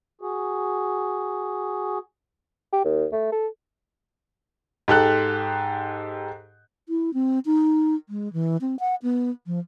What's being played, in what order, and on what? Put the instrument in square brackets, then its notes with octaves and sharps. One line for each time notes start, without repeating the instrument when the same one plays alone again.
[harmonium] F#4 G#4
[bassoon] G4
D#2
A3
A4
[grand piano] G#2 G4 A4 F#6
[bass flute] E4
C4
D#4
G#3
E3
C4
F#5
B3
F3